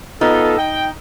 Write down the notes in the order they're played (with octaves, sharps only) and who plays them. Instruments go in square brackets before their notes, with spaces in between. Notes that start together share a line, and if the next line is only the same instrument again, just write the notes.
[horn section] B3 F4 A4 [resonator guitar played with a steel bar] D#4
[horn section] G5